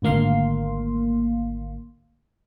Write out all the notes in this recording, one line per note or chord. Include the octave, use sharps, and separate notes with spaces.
G#1 D2 A#3 F5 C6